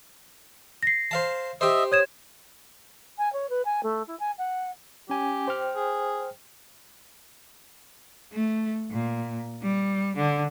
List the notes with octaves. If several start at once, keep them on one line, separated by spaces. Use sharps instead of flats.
A#6 C7
C5 F5 A5
G4 C5 D#5 E5
C#5 D#6 G#6 E7
G#5
C#5
B4
G#5
A3
E4
G#5
F#5
C#4 G4 G#5
C5 G5 F6
G#4
A3
A#2
G3
D3